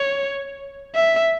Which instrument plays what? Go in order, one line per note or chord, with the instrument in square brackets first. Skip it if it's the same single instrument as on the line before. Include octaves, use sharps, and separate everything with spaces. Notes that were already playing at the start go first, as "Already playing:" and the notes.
Already playing: [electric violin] C#5
E5